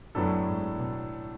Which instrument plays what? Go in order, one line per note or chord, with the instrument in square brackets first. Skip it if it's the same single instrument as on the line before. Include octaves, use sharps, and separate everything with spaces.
[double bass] F#2 [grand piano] A2 F#3 B3 D4 A4
[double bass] G#2
B2